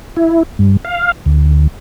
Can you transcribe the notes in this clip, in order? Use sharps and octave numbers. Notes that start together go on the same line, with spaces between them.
E4
G2
F5
D2